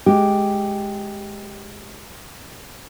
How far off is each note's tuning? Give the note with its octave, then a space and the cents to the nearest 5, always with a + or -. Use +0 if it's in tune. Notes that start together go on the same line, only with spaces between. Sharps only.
G#3 +10 G4 +0